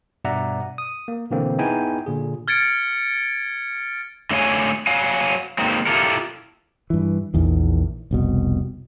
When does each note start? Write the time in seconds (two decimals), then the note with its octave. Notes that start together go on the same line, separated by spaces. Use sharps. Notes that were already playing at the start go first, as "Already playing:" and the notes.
0.24 G2 B2 D5 E5 F#5 A#5
0.78 D#6
1.08 A#3
1.31 B2 D3 E3 A#3 C4
1.58 B3 D#4 E4 G#4 G5 G#5
2.06 A#2 D3 G#4
2.48 F6 G#6 A6 C#7 D7
4.31 D3 A3 C#5 F5 G#5
4.87 F#3 F5 G#5
5.59 D#3 G#3 A#3 C4
5.87 E4 F4 G4 A4 A#4
6.90 G2 E3
7.34 A#1 E2 D#3
8.11 F1 C2 B2